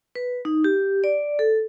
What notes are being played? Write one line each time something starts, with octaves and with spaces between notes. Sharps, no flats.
B4
D#4
G4
D5
A4